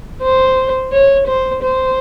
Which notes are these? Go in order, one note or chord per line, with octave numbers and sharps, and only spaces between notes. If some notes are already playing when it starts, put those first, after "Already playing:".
C5
C#5
C5
C5